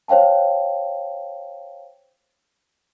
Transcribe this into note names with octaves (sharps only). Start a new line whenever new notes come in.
C5 C#5 F5 G5 A5